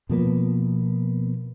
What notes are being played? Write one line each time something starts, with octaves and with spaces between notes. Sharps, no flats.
B2 F3 A#3 B3